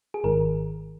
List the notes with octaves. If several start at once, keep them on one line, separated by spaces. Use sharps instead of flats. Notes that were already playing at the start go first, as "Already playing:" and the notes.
G#4
G#1 G#2 D#3 A#4